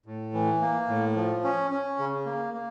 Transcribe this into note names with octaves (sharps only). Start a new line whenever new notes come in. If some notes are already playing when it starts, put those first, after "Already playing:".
A2
E3
A#3
A2
F3
C#4
C#4
C#3
A#3
A#3